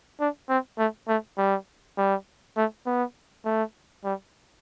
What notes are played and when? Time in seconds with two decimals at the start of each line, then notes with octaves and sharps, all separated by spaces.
0.20 D4
0.49 C4
0.78 A3
1.08 A3
1.38 G3
1.97 G3
2.57 A3
2.86 B3
3.45 A3
4.04 G3